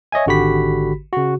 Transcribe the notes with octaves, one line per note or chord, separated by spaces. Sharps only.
C#5 D#5 E5 G#5
G#1 D3 F#4 G4 B5 B6
C#3 F#4